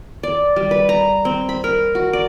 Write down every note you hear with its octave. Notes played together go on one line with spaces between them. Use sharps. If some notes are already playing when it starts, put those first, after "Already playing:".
D5
G3
B4
A#5
C4
B5
A#4
F#4
D5